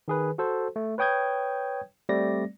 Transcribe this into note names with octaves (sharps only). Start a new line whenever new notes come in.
D#3 G#4 B4
F#4 A4 C5
A3
B4 C#5 G5 D#6 G6 G#6
G3 A3 C4 D5 A#6